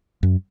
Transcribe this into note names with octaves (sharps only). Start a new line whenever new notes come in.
F#2